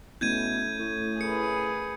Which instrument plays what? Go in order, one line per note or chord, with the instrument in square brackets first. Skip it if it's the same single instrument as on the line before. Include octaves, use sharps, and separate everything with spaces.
[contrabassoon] B2 [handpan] A3 C#4 E4 [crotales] G6 G#6 D#7
[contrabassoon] A2
[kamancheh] G#4 B4 [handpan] A#4 [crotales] C#7